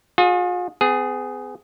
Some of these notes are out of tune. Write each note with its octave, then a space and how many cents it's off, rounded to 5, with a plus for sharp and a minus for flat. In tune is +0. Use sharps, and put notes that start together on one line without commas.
F4 +40 G#4 +0
B3 +45 G#4 +0